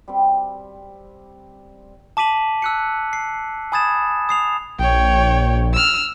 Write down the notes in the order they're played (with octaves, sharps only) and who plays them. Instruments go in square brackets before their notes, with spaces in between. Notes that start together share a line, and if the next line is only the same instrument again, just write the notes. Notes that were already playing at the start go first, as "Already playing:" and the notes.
[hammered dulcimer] G3 C4
[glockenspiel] A5 D6 B6 D#7 F#7
E6 F#6 C#7
C7
G#5 B5 D#6 G#6 A6 E7
D#6 C7 F7
[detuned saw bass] A#1 [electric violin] C#5 G5
[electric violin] E6 F6